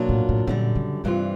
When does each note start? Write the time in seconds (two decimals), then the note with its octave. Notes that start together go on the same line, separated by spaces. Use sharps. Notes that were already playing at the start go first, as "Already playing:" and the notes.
Already playing: B2 F#3 A#3 D4 F4
0.09 A2
0.29 A2
0.47 F#2 A#2 D3 G3
0.76 C#3
1.04 G2 C3 E3 G3 C4 F4